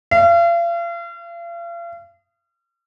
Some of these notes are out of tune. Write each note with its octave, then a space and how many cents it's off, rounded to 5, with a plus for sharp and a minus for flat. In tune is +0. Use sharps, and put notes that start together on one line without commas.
F5 -40